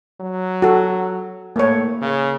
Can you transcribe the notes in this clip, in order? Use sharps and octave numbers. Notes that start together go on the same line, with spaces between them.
F#3
F#4 A4
A2 A#3 C#5
C#3